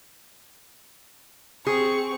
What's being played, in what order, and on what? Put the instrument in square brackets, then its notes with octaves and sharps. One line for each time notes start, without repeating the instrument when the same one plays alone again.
[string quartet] C4 C#6 [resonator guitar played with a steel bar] G#4